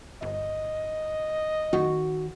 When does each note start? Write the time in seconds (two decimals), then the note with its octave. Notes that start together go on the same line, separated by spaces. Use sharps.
0.22 G1 D#5
1.73 D#3 F#4